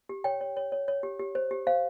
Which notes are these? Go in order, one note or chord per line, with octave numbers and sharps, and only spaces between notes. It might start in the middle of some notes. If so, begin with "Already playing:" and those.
G4
C#5 G5
C#5
C#5
C#5
C#5
G4
G4
C5
G4
C5 F5